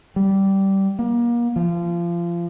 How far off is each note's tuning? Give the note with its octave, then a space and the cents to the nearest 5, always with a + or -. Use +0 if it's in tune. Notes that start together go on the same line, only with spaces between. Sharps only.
G3 -15
A#3 +30
F3 -25